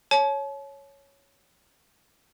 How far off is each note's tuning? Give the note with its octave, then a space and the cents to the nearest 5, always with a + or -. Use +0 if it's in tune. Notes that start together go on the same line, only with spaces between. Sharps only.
C#5 +0 A5 -40